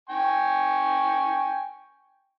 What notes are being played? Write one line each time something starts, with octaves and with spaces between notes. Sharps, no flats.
G5 G#5 C#6